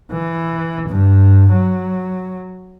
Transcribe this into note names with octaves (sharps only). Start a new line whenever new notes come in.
E3
G2
F#3